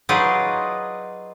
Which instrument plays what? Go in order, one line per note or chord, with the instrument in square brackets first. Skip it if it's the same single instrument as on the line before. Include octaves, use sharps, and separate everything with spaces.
[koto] F#3 D#4 F4 G#4 B4 D5